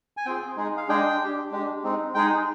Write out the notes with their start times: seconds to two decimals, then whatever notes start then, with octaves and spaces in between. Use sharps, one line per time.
0.17 G#5
0.26 C4 F4 G#4 G5
0.57 G#3 D#4 G#4
0.77 F5
0.88 G#3 D4 G#4 G5
1.21 D4 G4
1.51 G#3 D4 G4
1.84 G#3 C4 D#4
2.14 G#3 D#4 G#4 G5